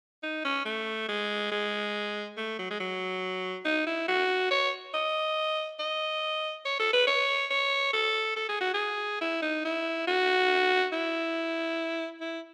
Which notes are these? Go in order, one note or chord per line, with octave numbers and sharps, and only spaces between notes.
D#4
C#4
A3
G#3
G#3
A3
F#3
G#3
F#3
D#4
E4
F#4
C#5
D#5
D#5
C#5
A4
B4
C#5
C#5
A4
A4
G#4
F#4
G#4
E4
D#4
E4
F#4
E4
E4